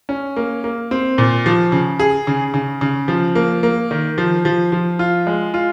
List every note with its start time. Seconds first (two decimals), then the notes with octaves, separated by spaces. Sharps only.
0.09 C#4
0.37 A#3
0.64 A#3
0.91 C4
1.18 A#2
1.46 F3
1.72 C#3
1.99 G#4
2.27 C#3
2.54 C#3
2.81 C#3
3.08 F3
3.35 A#3
3.63 A#3
3.91 D#3
4.18 F3
4.45 F3
4.72 F3
4.99 F4
5.27 G#3
5.54 F4